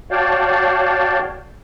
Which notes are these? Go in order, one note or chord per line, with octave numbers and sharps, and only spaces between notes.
F#4 C#5 D5 F5 G5 A5